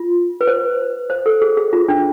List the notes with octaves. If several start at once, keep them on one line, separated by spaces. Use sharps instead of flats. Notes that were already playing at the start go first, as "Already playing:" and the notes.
Already playing: F4
B4
C5
C5
A4
G#4
G#4
F4
D4